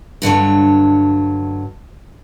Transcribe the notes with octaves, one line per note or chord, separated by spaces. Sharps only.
G2 D3 F#3 C#5